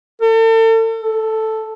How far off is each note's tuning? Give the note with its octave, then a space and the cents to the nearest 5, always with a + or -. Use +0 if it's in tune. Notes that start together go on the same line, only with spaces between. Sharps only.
A4 +40
A4 +0